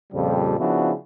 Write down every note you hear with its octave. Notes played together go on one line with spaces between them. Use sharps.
F2 A#2 C#3 F3 G3
C#3 F3 B3 D4 E4 F#4